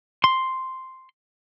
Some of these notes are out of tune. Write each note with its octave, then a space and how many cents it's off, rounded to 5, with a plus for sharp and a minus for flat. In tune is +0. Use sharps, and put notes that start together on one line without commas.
C6 +0